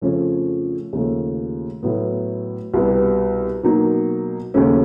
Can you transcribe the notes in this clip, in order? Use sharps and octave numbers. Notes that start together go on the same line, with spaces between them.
F2 C#3 F3 A3 C#4
D#2 C#3 F3 A3
A2 F#3 B3
C2 B2 G3 B3
B2 F#3 A#3 D#4
D#2 C#3 F#3 A3 C#4